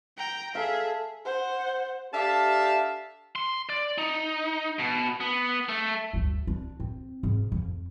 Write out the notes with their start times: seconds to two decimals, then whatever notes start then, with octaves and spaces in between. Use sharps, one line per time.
0.17 G5 A#5
0.55 G#4 A4 E5 F5
1.25 C5 F#5
2.13 D4 G4 A4 E5 F5 A5
3.36 C6
3.69 D5
3.98 D#4
4.79 B2
5.21 B3
5.69 A3
6.13 G1 D2
6.47 D4
6.80 C4
7.23 G#2
7.52 F2